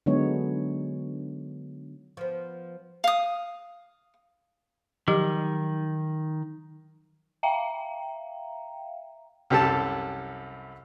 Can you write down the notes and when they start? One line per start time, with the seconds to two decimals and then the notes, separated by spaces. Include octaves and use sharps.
0.06 D3 F#3 G#3 B3 D#4 C#5
2.17 F3 B3
3.04 F5 D#6
5.08 D#3 F3 F#3 G4
7.43 E5 F5 G5 A#5
9.50 C2 F#2 G4 A4 A5